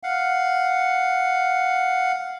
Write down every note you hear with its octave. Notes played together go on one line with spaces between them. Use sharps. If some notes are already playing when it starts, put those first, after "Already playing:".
F5 F#5